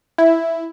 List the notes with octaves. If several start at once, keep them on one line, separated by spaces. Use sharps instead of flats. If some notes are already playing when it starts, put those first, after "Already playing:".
E4